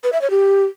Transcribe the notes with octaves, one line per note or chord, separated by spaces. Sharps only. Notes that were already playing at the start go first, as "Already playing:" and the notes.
B4
E5
C#5
G4